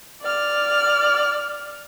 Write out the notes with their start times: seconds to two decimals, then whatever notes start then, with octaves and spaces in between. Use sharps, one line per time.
0.22 D5 F6